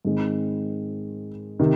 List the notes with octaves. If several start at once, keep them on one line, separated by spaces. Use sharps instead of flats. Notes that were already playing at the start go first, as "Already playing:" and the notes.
G#2 D#3 G#3 C4
C3 D#3